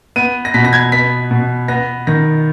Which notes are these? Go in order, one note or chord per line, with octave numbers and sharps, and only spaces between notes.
B3 D#7
A#6
B2 B6
A#6
G#6
B3 B6
B2
B3 A#6
D#3 A#6